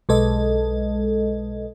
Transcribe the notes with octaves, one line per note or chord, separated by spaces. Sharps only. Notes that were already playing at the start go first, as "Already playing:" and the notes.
B1 G#3 A4 D#5